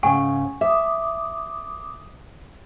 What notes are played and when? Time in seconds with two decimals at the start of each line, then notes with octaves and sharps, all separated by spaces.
0.03 G#2 C#3 F#5 G#5 C#6
0.61 E5 D6 D#6